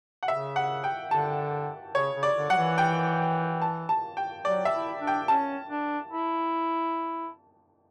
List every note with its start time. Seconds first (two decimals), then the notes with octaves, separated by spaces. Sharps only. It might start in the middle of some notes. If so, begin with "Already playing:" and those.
0.23 F#5
0.28 C#3 E5
0.56 F#5
0.84 G5
1.11 D3 A5
1.95 C#3 C#5
2.15 C#3
2.23 D5
2.37 D3
2.50 F#3 F#5
2.58 E3
2.78 G5
3.62 A5
3.89 A5
4.17 G5
4.45 F#3 D5
4.65 E5
4.72 E4
5.01 D4
5.07 G5
5.28 C#4 A5
5.70 D4
6.11 E4